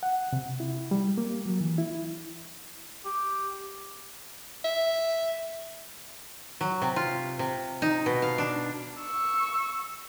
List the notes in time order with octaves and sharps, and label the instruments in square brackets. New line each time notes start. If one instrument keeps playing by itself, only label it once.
[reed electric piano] F#5
C3
E4
G3
A#3
F#3
E3
E4
[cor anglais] G4
[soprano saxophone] E5
[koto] F#3
C3
F4
C3
D#4
B2
F5
D4
[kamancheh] C#6 E6